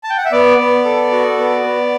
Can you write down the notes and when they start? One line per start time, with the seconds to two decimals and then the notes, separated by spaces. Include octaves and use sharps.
0.04 A5
0.10 G5
0.18 F#5
0.25 E5
0.32 B3 D5
0.58 B3
0.85 A4
1.12 F#4
1.37 B3
1.64 B3